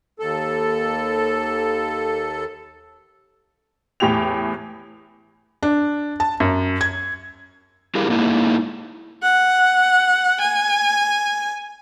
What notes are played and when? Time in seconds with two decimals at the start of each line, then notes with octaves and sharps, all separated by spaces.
0.19 D#2 A4
4.00 E2 A2 G4 G5 F7
5.63 D4
6.20 A5
6.40 F#2
6.81 G#6
7.95 G3 E4 G4 G#4 A#4 F5
8.08 G#2 A#3 D#4 E4
9.23 F#5
10.41 G#5